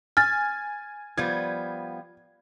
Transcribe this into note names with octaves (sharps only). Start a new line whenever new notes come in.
G#5 F6 A6
F3 G3 B3 G#6